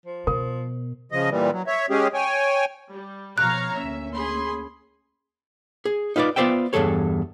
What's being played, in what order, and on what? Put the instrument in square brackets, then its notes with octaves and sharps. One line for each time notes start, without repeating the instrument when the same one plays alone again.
[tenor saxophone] F3
[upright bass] B2 [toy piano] A#4
[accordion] C#3 F3 D#5
A#2 E3 G3
F#3
C#5 E5
G#3 C#4 G4 G#4
C#5 G5 G#5
[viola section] G3
[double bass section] B2 F3 [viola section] C#5 F5 A#5 [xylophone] F#6
[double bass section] D2 A#3 C#4 [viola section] E5
[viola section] G#4 B5 C6
[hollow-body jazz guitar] G#4
D#4 F4 B4 C5 D5
B3 F4 C5 D5 E5 G5
E2 G2 F3 G#4 A4 C#5